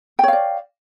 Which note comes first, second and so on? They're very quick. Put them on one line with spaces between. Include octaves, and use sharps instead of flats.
G5 C#5 F5 D5